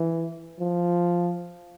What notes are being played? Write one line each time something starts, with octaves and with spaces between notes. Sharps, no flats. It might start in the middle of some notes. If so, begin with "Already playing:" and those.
Already playing: E3
F3